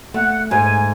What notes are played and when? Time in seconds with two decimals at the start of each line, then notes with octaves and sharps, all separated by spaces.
0.14 A3 F#5
0.51 G#2 G#5